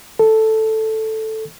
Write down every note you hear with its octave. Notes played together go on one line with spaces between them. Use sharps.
A4